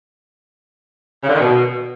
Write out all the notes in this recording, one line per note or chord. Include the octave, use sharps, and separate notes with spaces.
C#3
D3
D#3
B2